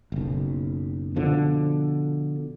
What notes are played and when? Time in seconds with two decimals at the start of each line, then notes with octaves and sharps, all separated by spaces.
0.12 F#1 B1
1.16 B2 D3 F3